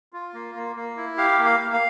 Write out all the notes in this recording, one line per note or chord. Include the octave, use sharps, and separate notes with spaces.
F4
A#3
A#3
A#3
E4
G4 F5
A#3
F5
A#3
F5